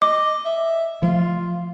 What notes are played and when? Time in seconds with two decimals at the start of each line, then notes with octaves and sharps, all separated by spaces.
0.02 D#5 D6
0.45 E5
1.02 F3 A3 F4